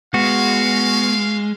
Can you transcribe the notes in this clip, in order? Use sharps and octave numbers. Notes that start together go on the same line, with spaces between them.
G#3 B3 F#4 F5